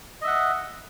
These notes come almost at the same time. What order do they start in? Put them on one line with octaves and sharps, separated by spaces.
D#5 E5 F#5